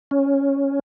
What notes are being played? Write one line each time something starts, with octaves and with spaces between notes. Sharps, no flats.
C#4